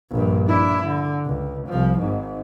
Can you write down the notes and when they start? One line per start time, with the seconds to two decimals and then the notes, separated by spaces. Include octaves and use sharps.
0.11 A#1 G2
0.47 D4 E4
0.83 D3
1.25 C#2
1.67 C2 F3
1.99 G#1 G#2